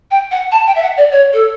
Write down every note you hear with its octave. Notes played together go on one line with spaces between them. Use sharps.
G5
F#5
A5
G5
E5
F#5
D5
C#5
A4